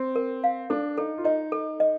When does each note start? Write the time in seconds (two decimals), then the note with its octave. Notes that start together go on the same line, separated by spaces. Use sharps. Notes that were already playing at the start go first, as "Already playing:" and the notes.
Already playing: C4
0.16 A#4
0.44 F5
0.70 D4 A4
0.98 D#4 A4
1.18 F4
1.24 D#4 D#5
1.52 A4
1.80 D#5